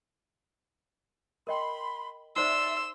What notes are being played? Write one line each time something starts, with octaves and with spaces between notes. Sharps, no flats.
A#4 D#5 G5 B5 C6
D#4 C5 D5 E5 C6 E6